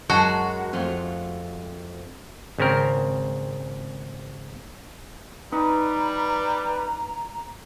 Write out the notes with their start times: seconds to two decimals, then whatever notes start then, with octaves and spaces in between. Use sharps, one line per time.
0.10 F#2 G#3 F#4 A5
0.73 F2 A3 F4
2.58 G#1 C#3 C4 A#4
5.52 G3 D#4 B4 A#5